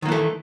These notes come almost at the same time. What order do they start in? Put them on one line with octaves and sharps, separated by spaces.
D#3 A#3 E3 A3